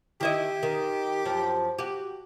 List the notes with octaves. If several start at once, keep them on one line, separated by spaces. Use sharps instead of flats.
D#3 E4 G4 D#5
D#3
F#2 F3
F#4 G4